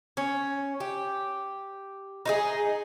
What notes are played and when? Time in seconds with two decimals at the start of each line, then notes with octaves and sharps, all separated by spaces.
0.17 C#4
0.80 G4
2.25 D#4 F4 G#4